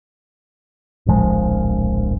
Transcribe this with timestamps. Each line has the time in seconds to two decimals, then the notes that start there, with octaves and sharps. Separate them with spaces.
1.06 D1 A#1 F3 G#3